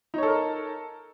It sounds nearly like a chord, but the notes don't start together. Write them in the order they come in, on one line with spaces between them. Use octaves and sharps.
D#4 C#5 A4 A#4